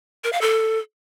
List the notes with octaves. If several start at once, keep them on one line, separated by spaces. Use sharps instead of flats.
A#4
F5
A4